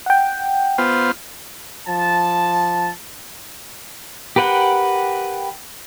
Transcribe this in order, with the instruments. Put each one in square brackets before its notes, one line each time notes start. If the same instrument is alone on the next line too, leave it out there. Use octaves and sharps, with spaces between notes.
[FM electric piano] F#5 G5
[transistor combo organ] B3 F4 C5
[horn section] F3 A5
[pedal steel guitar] G4 A#4 B4 F#5 G5